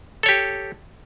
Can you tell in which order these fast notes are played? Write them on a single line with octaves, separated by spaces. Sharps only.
A4 C#5 G4